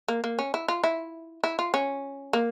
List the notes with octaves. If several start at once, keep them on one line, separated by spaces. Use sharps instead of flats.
A#3
A#3
C#4
E4
F4
E4
E4
F4
C#4
A#3